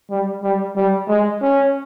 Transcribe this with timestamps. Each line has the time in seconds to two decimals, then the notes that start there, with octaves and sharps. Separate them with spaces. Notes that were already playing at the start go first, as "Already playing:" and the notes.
0.10 G3
0.43 G3
0.76 G3
1.08 G#3
1.42 C#4